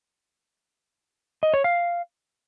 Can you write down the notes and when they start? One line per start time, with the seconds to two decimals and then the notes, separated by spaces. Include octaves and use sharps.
1.43 D#5
1.54 C#5
1.64 F5